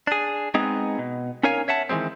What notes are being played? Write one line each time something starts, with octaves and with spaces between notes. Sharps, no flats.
D4 G#4
G#3 B3 C4 D#4 G#4
B2
C#4 D#4 A#4 C#5 F5 G#5
C#5 E5 F#5 A5
D#3 E3 F#3 G#3 C4